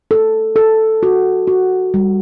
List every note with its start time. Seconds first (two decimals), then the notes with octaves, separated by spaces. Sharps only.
0.11 A4
0.56 A4
1.03 F#4
1.47 F#4
1.94 G3